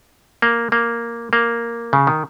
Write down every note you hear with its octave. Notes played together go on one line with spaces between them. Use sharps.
A#3
A#3
A#3
C#3
D#3